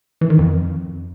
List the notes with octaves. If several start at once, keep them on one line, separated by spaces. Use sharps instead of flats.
E3
D#3
F2